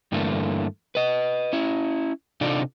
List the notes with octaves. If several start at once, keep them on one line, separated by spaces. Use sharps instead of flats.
G2 D3 E3 A3 A#3
B4 D#5
C#4 E4
C3 D4 D#4 F4 A4 D5